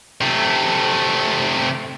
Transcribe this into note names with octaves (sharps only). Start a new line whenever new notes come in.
C3 A3